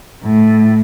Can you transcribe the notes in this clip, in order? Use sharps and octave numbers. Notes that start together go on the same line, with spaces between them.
A2